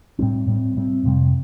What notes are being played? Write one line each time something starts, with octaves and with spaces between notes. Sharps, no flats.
A2 G3 C4
A2 G3 C4
A2 G3 C4
F2 C3 G3